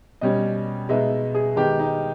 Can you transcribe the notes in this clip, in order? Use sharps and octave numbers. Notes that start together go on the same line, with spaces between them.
B2 G3 C#4 D#5
B2 G#3 B3 D#4 E5
G#4
D#3 G#3 B3 D#4 G4
D#4